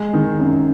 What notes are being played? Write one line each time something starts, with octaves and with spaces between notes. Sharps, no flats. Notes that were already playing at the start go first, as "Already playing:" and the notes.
Already playing: G#3
D#3
F#2